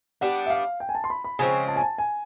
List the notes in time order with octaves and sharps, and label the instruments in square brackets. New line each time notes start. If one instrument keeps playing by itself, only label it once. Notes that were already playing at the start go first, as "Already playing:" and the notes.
[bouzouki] G3 B3 D4 [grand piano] F#5
[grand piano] E5
F5
G5
G#5
A5
C6
B5
B5
[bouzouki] C#3 F3 G#3 C4 [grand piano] G#5
[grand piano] A5
G#5
A5
G#5